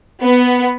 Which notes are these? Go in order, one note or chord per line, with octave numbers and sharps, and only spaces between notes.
B3